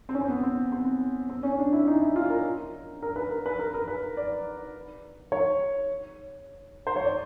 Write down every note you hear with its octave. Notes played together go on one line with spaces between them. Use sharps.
C4
C#4
C4
B3
C4
C4
C4
C#4
D4
E4
D#4
E4
F4
A#4
A#4
B4
A#4
B4
A#4
A#4
B4
D5
C#5
C5
C#5
D5